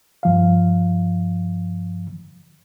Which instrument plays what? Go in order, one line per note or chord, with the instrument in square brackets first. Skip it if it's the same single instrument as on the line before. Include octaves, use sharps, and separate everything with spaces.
[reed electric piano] G2 F3 F5